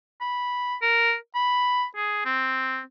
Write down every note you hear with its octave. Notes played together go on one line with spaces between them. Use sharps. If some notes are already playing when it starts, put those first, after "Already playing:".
B5
A#4
B5
G#4
C4